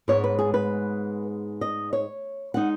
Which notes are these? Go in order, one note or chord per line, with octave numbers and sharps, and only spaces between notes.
G#2 G#3 B3 C#5
B4
G#4
B4
D#5
C#5
G#3 D#4 F#5